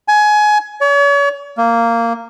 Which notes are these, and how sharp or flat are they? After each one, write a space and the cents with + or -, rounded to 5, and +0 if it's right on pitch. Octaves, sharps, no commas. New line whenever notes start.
G#5 +20
C#5 +40
A#3 -10